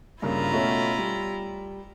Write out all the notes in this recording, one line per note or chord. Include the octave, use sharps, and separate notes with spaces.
G2 C#3 A#3 E4 F4 A#5
B2 A3 C#4
G3